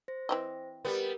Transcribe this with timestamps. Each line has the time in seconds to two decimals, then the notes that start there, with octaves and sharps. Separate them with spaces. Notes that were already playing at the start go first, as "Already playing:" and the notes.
0.08 C5 A#6
0.29 E3 C4 D#5
0.85 G3 B3 A#4